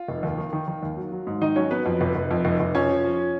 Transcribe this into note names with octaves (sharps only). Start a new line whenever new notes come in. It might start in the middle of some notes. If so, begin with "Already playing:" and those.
Already playing: F4
F1
D#2
D#3
D#3
D#3
D#2
F#3
F#3
G#2
D#3 D#4 D#5
F#3 C#4 C#5
F#3 B3 B4
F2
F1
F1
F2
F1
F1
F3 C#4 C#5
F3
F3